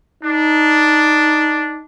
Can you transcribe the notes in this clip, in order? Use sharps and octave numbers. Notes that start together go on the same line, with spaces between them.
D4 D#4